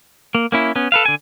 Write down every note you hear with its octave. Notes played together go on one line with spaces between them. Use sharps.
A#3
A#3 C#4 E4
B3 C#4
A4 B4 F5
D3 G#5